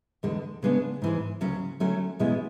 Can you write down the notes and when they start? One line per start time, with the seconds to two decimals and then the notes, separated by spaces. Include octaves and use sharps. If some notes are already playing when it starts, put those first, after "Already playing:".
0.23 E2 D3 G#3
0.63 C#3 G#3 B3 D4
1.02 G#2 E3 G#3
1.41 D2 C#3 F#3 C#4
1.80 D3 F#3 A3 C#4
2.19 E2 B2 G#3 C#4 E4